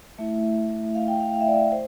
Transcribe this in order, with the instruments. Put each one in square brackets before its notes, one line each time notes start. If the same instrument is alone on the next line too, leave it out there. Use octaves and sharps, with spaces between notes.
[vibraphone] A3 E4 E5
F5
G5
F5
F5
E5
D5
E5
C5